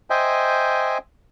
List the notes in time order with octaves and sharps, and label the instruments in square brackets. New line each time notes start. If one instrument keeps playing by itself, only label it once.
[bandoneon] C5 D#5 E5 G5 G#5